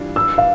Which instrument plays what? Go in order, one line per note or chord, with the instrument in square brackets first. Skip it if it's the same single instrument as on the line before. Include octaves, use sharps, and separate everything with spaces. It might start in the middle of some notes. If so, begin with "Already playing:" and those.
Already playing: [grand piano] E3 G3 D4 F4
[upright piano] E6
F5